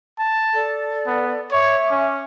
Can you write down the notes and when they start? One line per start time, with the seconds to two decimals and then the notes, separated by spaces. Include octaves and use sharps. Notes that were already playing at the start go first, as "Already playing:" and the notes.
0.20 A5
0.54 A4 D5
1.07 B3
1.51 C#5 E5 C#6 D6
1.91 C#4